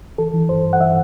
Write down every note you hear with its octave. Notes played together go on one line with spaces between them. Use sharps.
E3 A4
E3
G2 C5
G2
F#5
E3 E5